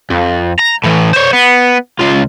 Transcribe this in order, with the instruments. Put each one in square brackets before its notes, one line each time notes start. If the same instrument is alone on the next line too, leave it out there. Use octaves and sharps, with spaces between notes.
[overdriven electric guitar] F2
A#5
A2 E3
C5 C#5
B3
C#2 F4